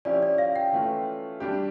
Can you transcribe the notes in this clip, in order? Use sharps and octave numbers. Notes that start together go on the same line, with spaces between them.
F3 C#4 E4 G4 D5
D5
F5
G5
E3 A3 C#4 F4
G3 D4 G4